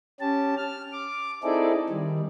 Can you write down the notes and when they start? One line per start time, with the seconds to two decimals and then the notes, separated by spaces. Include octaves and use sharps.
0.20 C#4 G4 A5
0.57 F6
0.93 D6
1.43 C4 D#4 E4 G#4 A4 D5
1.89 D#3 G3